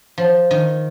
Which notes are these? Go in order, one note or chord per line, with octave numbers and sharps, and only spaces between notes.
F3
D#3